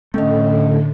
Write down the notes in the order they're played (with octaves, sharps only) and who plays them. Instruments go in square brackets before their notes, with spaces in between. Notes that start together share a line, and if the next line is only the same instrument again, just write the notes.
[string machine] A2 D3 [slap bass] A3 [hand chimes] C#4 D#5